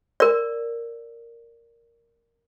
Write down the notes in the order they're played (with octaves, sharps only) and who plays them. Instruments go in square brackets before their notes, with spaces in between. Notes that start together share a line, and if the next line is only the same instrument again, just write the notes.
[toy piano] A#4 D5